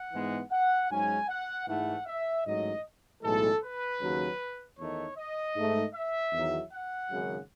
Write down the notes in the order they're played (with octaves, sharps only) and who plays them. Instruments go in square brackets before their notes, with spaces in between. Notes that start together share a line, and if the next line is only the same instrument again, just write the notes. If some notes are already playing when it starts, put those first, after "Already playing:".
Already playing: [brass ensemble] F#5
G#2 E3 G#3 B3
F#5
G#2 F#3 C#4 G#5
F#5
G#2 E3 A3 F#5
E5
A1 G#2 F#3 A3 D#5
B1 A2 E3 G#3 A4
B4
D#2 C#3 F#3
E2 D#3 A3 D#4 C#5
D#5
G#2 D#3 A3
E5
E2 D#3 F#3
F#5
G#1 F#2 C#3